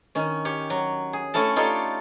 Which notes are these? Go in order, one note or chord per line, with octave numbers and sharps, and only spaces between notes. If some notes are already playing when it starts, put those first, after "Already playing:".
D#3 C#4
G4 C#5
F#3
G#4
A3 C#4 E4 A4 A5
D#4 F4 G4 A4 C#5 D5